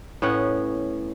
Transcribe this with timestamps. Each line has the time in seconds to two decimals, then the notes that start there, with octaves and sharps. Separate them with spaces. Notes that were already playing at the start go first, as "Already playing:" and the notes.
0.22 A2 B3 C#4 F#5